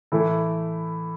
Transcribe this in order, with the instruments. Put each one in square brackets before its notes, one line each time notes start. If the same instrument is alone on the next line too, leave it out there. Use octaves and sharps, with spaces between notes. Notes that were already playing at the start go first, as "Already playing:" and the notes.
[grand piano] A2 E3 A3 E4 A4